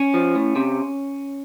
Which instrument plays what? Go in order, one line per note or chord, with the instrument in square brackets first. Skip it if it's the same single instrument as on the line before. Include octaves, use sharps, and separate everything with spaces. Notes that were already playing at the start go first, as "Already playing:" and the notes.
Already playing: [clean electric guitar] C#4
F3
A2
C3